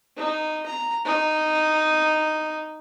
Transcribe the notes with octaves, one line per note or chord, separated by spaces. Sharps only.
D#4
A#5
D#4